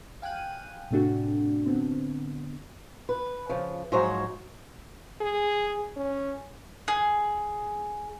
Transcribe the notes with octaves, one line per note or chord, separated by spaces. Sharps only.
F5 G5 G#5 F#6 D#7
A2 C3 A3 D4 F#4
D3 B3 C4
B4
C#3 F3
G#2 F3 F#3 C5 C#5 A#5
G#4
C#4
G#4